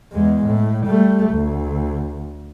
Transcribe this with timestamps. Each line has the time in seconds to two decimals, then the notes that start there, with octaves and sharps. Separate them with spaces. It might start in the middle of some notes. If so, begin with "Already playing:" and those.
0.12 E2 G#3
0.46 A2
0.87 G3 A3
1.31 D2